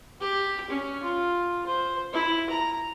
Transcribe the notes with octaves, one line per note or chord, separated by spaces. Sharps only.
G4
C#4
F4
C5
E4
A#5